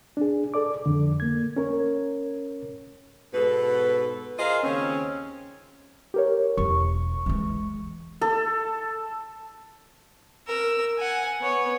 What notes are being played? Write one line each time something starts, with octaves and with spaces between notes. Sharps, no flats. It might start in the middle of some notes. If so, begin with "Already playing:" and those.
D4 G#4
A4 D5 D6
F2 D3
A#3 G#6
C#4 A#4 C#5
G#2 B2 A4 B4
F4 G#4 A#4 C5 D#5 F5
D#2 C#3 C4 C#4
G4 A#4 C#5
E1 C#6
E3 G#3
A4
A#4 E6
F#5 G#5
B3 C#5